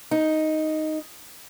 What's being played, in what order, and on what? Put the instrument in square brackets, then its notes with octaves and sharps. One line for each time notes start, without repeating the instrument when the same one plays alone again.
[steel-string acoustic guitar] D#4